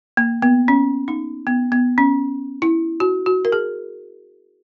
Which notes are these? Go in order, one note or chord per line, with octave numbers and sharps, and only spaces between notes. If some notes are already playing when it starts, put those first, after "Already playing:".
A#3
B3
C#4
D#4
B3
B3
C#4
E4
F#4
F#4
A#4
G#4